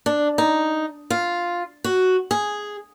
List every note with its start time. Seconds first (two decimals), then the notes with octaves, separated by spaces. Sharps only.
0.06 D4
0.38 D#4
1.10 F4
1.84 F#4
2.31 G#4